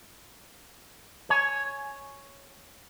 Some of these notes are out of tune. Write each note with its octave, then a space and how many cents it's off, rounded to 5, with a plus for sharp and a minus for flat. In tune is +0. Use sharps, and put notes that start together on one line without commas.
C#5 +0 G#5 +20